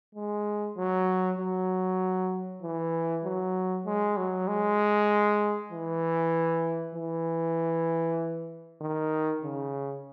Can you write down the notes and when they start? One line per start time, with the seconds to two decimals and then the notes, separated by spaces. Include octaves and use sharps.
0.15 G#3
0.77 F#3
1.39 F#3
2.63 E3
3.24 F#3
3.86 G#3
4.17 F#3
4.48 G#3
5.72 E3
6.95 E3
8.81 D#3
9.43 C#3